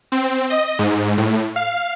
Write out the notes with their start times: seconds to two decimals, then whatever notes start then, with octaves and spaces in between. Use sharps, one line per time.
0.12 C4
0.50 D#5
0.79 G#2
1.18 A2
1.56 F5